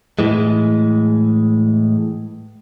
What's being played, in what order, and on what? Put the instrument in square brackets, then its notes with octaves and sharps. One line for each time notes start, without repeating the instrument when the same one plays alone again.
[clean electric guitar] A2 E3 G#3